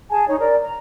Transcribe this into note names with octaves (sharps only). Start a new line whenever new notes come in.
G#4 G#5 A5
D#4 C#5
A#4 D5
A#5